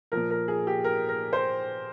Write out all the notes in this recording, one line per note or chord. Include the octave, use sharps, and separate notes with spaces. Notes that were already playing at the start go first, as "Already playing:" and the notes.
A#2 F3 A#4
A#4
G#4
G4
A#4
A#4
C5